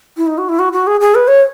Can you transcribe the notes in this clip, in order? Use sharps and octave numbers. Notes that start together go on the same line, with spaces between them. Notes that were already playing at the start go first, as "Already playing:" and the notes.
E4
D#4
F#4
E4
F#4
F#4
G#4
G#4
B4
C#5